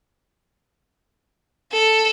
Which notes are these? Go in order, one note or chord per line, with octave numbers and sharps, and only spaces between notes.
A4